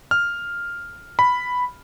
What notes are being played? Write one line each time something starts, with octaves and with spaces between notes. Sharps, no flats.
F6
B5